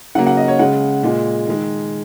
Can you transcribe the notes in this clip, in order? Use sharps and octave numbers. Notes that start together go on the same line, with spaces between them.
C#3 F#3 A#3 F#5
F#5
D#5
C#5
C#3 G#3 F#5
A#2 G#3
D#3 G#3